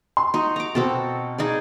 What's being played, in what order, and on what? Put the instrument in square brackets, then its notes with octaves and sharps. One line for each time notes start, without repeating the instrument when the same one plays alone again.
[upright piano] C6
[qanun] D#4 F#4
A#5 D6
[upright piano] B2 [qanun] C4 F#4 A4
[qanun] D#4 G#4 D5